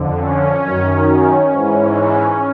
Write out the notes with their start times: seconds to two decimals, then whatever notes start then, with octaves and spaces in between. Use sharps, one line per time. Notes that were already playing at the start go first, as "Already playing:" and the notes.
Already playing: F2 D3
0.19 C#4
0.63 F#2 D#3
1.52 G#2 E3